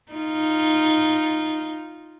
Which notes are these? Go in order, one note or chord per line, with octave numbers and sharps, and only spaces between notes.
D#4 F4